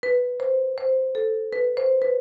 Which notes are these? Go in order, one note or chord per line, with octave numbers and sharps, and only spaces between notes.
B4
C5
C5
A4
B4
C5
B4